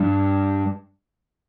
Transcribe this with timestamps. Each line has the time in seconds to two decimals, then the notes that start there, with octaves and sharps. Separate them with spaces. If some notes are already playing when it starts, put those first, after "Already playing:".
Already playing: G2